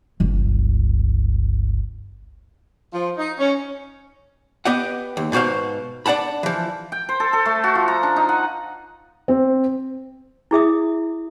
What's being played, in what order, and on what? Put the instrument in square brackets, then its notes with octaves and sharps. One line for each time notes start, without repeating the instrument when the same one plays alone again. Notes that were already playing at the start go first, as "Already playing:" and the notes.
[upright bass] G1 C#2
[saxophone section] F3
D#4
C#4
[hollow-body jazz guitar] B3 G4 D#5 F#5
D#2
G#2 B2 F#4 C5 F5
D4 D5 F#5 A5 B5
E3 F3
[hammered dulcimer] G5
C5
A4
A4
A3
F#4
F3
A#5
D4
D#4
F#5
[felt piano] C4
[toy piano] E4 G#4 E5 D#6